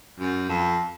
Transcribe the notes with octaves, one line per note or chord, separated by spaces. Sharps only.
F#2
F2